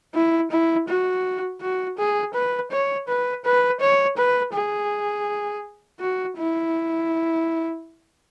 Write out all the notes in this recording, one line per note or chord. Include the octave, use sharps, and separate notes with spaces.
E4
E4
F#4
F#4
G#4
B4
C#5
B4
B4
C#5
B4
G#4
F#4
E4